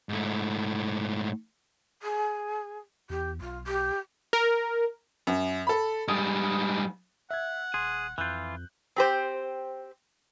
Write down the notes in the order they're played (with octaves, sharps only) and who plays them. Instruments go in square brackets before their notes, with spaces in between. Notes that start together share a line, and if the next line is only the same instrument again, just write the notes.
[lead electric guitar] G#2 A3
[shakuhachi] G#4
[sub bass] E2 [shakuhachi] G4
[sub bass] B1 [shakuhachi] F4
[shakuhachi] G4
[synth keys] A#4
[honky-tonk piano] F#2
A4 B5
[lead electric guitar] G#2 G3 [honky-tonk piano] D#6
[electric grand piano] E5 G#6 [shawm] F#5
[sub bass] D#1 [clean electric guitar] G#4 [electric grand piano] C6
[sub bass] F2 [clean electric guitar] E3 F4 [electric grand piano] F#6 G6
[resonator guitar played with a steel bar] C4 G4 C5